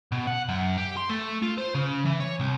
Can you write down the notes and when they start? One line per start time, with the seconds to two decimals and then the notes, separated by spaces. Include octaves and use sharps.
0.12 B2
0.27 F#5
0.49 F#2
0.78 G4
0.97 C6
1.09 A3
1.42 F4
1.58 C5
1.75 C#3
2.06 E3
2.20 C#5
2.40 C2